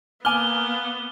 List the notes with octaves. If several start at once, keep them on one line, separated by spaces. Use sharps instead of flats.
A#3 B3 G#5 D6 F6 G7